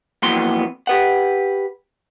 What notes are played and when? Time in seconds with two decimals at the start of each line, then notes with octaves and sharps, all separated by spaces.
0.22 F2 A#2 E3 F#3 B3 C6
0.87 G4 B4 F#5